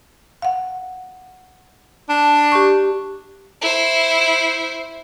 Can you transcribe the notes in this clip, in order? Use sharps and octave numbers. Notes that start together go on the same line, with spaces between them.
F5 F#5
D4
G4 C#6
E4 C5